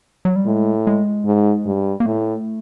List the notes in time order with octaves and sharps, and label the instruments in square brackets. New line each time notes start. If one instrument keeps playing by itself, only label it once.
[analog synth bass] F#3
G3
[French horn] A2 [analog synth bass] G#3
[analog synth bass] G#3
[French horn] G#2
G2
[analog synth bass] A#3
[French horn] A2 [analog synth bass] A3